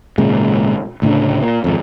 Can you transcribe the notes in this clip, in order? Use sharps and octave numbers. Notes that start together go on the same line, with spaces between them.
G#1 A#2 C#3 G#3
D2 A2 C#3 D4
A#2
G#1 F2